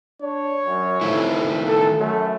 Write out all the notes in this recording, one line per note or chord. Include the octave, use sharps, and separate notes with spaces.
D4 C#5
F#2
F2 D#3 A3 E4
A4
F#2 A3